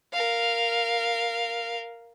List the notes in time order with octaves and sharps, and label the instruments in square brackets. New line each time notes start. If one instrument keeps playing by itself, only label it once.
[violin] A#4 F5